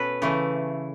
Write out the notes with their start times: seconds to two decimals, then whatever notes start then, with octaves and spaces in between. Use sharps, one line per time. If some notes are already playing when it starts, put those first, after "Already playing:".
Already playing: B2 C#4 A4 B4
0.22 C#3 E3 A3